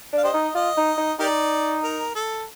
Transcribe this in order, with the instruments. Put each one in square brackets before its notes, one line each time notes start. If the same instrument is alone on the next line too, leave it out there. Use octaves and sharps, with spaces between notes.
[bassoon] D4 [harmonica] F5
[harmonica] G4 C5 D#5
[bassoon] D#4
[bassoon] F4 [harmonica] D#5
[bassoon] D#4
D#4
[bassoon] D#4 [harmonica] G4 A#4 D5
[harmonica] A#4
A4